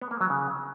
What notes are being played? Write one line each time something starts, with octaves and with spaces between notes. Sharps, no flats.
B3
A#3
F#3
C#3